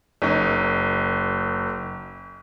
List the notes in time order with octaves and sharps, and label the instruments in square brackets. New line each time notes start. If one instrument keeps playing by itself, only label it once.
[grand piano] F#1 D#4